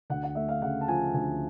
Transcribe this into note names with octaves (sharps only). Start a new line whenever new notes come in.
D2 F#5
F#5
A3 E5
F5
C#3 F#5
A5
F3 G#5
D2 G#5